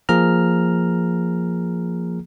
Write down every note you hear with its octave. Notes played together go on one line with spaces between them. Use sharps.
F3 A#3 G#4 A#5 F6